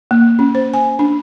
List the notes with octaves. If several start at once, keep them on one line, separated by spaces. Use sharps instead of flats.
A#3
C#4
C5
G#5
D4